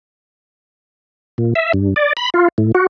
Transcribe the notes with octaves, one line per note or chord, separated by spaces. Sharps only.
A#2
E5
G2
D5
B5
F4
A2
F#4